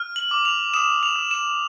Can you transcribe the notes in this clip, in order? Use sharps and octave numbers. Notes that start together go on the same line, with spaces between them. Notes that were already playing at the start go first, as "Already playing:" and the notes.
Already playing: F6
F#7
D6
F7
D#6 E7
F7
D#6
E7